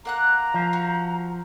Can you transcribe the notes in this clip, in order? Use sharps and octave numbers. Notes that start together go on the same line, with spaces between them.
A#3 F#5 A#5 F#6
F3
F#4